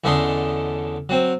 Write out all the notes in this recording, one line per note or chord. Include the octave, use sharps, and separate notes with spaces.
E2 D3 A3 C#4 D#5 C6
F#3 C4